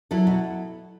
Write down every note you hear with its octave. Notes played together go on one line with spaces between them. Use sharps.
F#3 E4 A4
B2